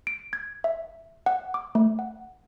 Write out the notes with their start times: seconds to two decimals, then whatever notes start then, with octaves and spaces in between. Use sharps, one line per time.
0.07 D7
0.33 G#6
0.64 E5
1.26 F#5
1.54 D6
1.75 A3
1.99 F#5